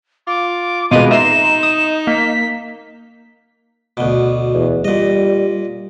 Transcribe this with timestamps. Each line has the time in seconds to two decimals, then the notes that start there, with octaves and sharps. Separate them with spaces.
0.27 F4 D6
0.91 B2 G#3 F4 B4 D#5 D6 D#7
1.11 D#4 E5 A#5 C6 E7
1.63 D#6
2.07 A#3 B6
3.97 D2 B2
4.55 E2
4.84 A#2 G3 D#5